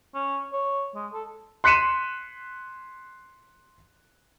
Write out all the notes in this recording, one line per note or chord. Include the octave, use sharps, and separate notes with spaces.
C#4
C#5
G#3
A4
C6 F#6 B6 C#7 D#7 E7